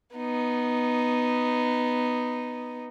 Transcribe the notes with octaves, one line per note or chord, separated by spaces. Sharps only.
B3 D#4